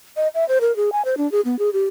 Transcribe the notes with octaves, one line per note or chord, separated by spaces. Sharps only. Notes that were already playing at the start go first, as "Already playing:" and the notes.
D#5
E5
C5
A#4
G#4
G#5
C5
D4
G#4
B3
G#4
G4